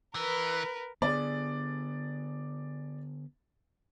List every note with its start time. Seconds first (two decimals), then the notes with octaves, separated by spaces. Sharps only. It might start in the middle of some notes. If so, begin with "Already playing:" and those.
0.15 E3 A#4 B4
1.02 D3 B3 G#4 D5